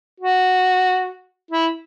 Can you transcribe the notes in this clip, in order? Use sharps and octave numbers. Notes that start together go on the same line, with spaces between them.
F#4
E4